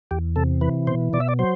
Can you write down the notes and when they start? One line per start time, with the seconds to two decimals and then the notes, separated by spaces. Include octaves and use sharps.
0.11 E2 G4
0.36 C3 A4
0.61 E3 B4
0.87 B2 C5
1.13 B2 D5
1.20 E5
1.29 D5
1.39 F#3 C5